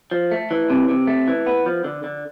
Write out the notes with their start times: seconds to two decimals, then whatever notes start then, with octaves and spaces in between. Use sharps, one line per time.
0.11 F3
0.32 A3
0.51 E3
0.70 C3
0.89 C3
1.07 A3
1.28 E3
1.46 B3
1.66 F3
1.84 D3
2.04 D3